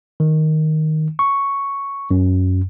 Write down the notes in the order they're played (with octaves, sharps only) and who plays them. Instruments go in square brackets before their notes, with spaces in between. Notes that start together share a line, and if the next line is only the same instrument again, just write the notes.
[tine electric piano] D#3
C#6
F#2